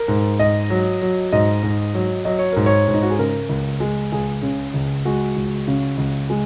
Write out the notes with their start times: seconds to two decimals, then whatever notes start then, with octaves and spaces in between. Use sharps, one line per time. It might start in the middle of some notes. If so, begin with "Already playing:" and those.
Already playing: A#4
0.08 G#2
0.39 G#2 D#5
0.70 F#3
1.02 F#3
1.32 G#2 D#5
1.63 G#2
1.94 F#3
2.25 F#3 D#5
2.39 C#5
2.53 G#2 A#4
2.66 C#5
2.88 G#2
2.94 D#4
3.03 F#4
3.10 G#4
3.18 C#3 A#4
3.49 C#2
3.80 G#3
4.12 C#2 G#4
4.42 C#3
4.74 C#2
5.05 G#3 F#4
5.36 C#2
5.67 C#3
5.98 C#2
6.30 G#3